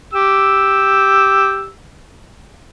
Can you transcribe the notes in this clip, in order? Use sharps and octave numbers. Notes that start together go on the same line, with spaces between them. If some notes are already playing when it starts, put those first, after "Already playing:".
G4 E6